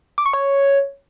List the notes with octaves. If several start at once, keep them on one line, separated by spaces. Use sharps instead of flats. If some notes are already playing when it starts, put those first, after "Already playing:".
D6
C#6
C#5